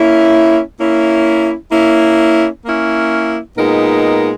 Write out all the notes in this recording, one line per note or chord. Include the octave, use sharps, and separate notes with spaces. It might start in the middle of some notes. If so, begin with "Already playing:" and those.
Already playing: A#3 C#4 E4
A#3 C#4 E4
A#3 C#4 E4
A#3 C#4 E4
A#2 G#3 B3 D#4 A#4